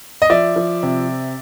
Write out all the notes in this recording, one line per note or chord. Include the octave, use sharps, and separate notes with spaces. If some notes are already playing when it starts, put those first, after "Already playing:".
D#5
F3 D5 E5
F3
C3